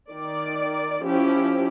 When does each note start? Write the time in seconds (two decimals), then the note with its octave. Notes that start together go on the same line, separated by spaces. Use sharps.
0.11 D#3 D5
1.02 F3 C#4 E4 G4